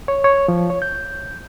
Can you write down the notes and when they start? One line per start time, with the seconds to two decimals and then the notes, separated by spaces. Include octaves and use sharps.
0.08 C#5
0.24 C#5
0.48 F3
0.70 C#5
0.82 G6